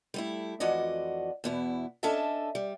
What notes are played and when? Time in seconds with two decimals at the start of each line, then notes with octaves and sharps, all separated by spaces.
0.14 G3 A3 E4
0.60 F2 E3 F#4 D5 D#5
1.44 E2 B2 E4
2.03 C#4 D4 A4 D#5 E5 A5
2.55 G3